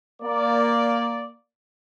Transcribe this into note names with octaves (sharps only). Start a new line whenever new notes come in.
A#3 D5